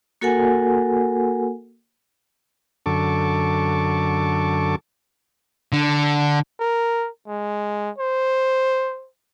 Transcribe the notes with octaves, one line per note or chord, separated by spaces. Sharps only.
A#3 F#4 A4 A#4 F#5 G#5
F#2 D3 A4 A5 C#6 D6
D3
A#4
G#3
C5